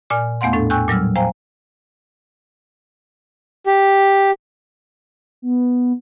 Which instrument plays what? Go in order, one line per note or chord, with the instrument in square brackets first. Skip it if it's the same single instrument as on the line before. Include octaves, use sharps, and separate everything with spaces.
[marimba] A#2 D5 G#5 F6
E2 A3 B3 F5 F#5 C6
A2 D4 A4
G5 G#5 C#6 E6 F#6 G6
A#2 F#3 G3 E6 F6
C5 F5 G5 G#5 A#5
[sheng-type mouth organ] G4
[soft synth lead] B3